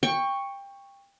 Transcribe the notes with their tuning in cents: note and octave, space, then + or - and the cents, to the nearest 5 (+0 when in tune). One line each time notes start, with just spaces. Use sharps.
G5 +20 C#6 +0